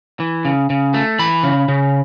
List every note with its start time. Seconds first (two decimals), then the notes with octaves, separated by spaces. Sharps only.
0.20 E3
0.45 C#3
0.70 C#3
0.94 A3
1.19 E3 B5
1.43 C#3
1.68 C#3